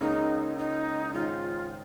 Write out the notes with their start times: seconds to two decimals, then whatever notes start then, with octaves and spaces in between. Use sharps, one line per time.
0.01 C#2 C#3 A#3 D#4
0.58 D#4
1.14 G#1 G#2 G#3 C#4 F4